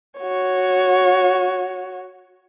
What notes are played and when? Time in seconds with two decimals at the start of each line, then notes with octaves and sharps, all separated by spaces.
0.20 F#4 C#5